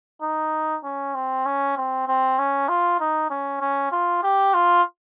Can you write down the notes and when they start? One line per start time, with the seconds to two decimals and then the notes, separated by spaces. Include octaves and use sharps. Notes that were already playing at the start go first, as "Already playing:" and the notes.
0.22 D#4
0.85 C#4
1.15 C4
1.46 C#4
1.77 C4
2.08 C4
2.39 C#4
2.69 F4
3.00 D#4
3.30 C#4
3.61 C#4
3.92 F4
4.23 G4
4.54 F4